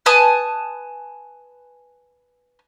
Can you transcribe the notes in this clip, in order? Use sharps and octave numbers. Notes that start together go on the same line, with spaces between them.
B4 G#5 A5 D#6